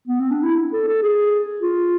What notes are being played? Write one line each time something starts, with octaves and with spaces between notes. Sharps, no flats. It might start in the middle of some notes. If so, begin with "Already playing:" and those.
B3
C4
D4
E4
A4
A4
G#4
F4